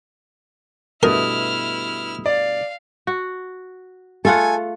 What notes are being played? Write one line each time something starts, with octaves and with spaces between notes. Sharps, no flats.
G2 B2 A3 E4 A#4 D#6 F6
D5 F5
F#4
A3 F4 A4 F#5 G#5